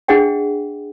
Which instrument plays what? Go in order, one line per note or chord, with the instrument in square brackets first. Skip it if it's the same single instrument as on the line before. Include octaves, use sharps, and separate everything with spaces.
[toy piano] D4 G#4 D#5 F#5 G5